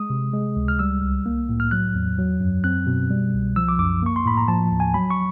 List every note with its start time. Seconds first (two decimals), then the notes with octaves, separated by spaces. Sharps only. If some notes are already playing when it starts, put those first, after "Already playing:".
Already playing: G#3 D#6
0.10 C3
0.33 G#3
0.56 C#2
0.68 F6
0.79 G3 E6
1.02 C2
1.26 A#3
1.49 A2
1.60 F6
1.71 F#3 F#6
1.95 E2
2.18 F#3
2.41 F#2
2.64 C4 F#6
2.87 B2
3.10 G3
3.33 C2
3.56 F3 E6
3.68 D6
3.79 F#2 D6
4.03 A#3 C#6
4.16 C6
4.25 A2 B5
4.37 A#5
4.48 F3 A5
4.71 D#2
4.80 G#5
4.94 F#3 B5
5.10 C#6